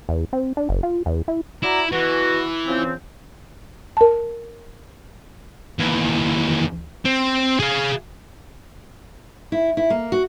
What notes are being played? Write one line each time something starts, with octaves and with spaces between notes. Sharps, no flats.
E2
C4
D4
F#1
F4
E2
E4
E4 F#4 D5 A#5
B2 E3 F#4
C#3 F3 C4
A#4 A5
D#2 E3
C4
G#4 F5
E4
E4
A#3
F#4